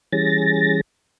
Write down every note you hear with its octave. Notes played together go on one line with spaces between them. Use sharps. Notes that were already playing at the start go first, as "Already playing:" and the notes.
E3 G3 C#4 G#4 A6 A#6